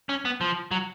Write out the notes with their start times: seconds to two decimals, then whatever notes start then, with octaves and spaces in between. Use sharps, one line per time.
0.09 C#4
0.25 B3
0.41 F3
0.71 F#3